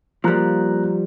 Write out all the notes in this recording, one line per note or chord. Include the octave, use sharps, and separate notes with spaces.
F3 G3 A#3 A#5 F#6